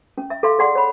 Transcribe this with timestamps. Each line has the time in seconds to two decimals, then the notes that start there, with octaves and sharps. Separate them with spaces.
0.18 C#4
0.30 E5
0.43 A4 F5 C6
0.58 G#4 D5 F#5 C6
0.75 C#5 F#5 B5